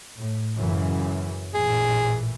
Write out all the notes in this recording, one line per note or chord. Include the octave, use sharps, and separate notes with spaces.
A2
F#2 C#3 E3
A1 A#2 E3 G#4